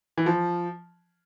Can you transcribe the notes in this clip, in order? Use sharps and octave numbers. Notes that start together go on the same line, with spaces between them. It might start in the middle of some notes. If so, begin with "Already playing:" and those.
E3
F3